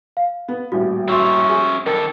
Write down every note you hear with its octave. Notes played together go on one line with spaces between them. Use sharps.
F5
B3
D#1 A1 F#4
C#4 F#4 E5 C6
G#4
D#3 A4 A#4